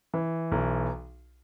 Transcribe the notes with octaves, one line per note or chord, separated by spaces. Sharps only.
E3
B1